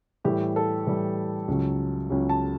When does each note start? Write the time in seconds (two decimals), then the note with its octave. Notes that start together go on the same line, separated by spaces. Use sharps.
0.25 A2 E3 G3 G4
0.56 A4
0.87 A2 E3 G3
1.48 C#2 C#3 F#3
2.10 C#2 C#3 F#3
2.29 A5